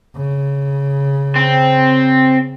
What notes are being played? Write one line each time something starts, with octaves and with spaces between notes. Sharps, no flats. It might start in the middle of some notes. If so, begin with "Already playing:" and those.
C#3
C4